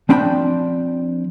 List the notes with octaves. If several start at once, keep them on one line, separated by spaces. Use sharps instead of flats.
F3 C4 D4 G5 B5